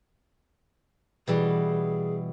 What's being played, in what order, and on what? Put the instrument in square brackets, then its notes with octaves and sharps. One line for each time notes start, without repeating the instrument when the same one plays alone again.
[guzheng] B2 E3 G3 [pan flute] G#4